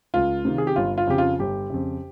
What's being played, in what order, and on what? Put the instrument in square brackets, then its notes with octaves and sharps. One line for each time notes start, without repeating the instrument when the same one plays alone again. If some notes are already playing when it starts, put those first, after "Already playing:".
[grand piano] C#2 F4
C3 D#3
G#4
G4
G1 F4
F4
F2 C#3 G4
F4
G1 G4
F2 C#3